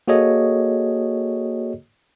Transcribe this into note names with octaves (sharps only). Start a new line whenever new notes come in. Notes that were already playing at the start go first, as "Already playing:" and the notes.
A#3 F#4 G#4 A4 C#5 D#5